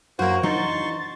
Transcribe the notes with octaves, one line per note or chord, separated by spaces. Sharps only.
F#2 F#3 A#3 F#4 C5
E3 D4 D#4 C6 C#6 A6